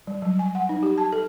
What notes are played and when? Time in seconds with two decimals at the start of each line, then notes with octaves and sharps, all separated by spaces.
0.07 G3
0.22 F#3
0.39 G#5
0.55 F#5
0.69 D#4
0.83 G4
0.98 A5
1.12 A4